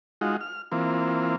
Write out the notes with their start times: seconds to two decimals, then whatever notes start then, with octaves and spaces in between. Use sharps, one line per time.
0.21 G#3 D#4 F4 F#4
0.41 F6
0.72 E3 A#3 C4 F4